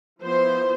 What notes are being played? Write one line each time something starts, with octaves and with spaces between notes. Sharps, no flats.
F3 B3 E4 C5